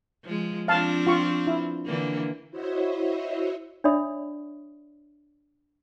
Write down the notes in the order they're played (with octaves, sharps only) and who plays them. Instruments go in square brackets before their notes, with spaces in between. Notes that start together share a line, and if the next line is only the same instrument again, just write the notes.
[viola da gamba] F3 G#3
[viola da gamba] F3 C4 D4 [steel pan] F5 A5
[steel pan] F4 C#6
E4
[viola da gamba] D3 E3 A#3
[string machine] E4 F#4 C5 C#5 D#5 E5
[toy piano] D4 C#5 D5 E5 B5 D#6